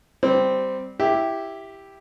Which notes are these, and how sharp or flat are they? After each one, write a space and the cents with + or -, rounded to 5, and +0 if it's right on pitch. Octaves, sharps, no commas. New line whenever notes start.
G3 +0 C4 -10
E4 +0 G4 +0 E5 +0